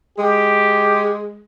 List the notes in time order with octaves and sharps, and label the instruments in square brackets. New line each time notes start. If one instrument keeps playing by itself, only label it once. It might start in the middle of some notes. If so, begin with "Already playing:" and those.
[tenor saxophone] G#3 [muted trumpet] G4